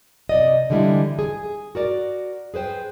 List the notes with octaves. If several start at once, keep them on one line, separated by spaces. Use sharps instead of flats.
C3 D5 D#5
D3 E3 G3 G#3 E4
G#4
F#4 A#4 D5
G#4 B4 C5 G5